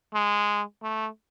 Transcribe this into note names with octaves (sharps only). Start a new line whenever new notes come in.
G#3
A3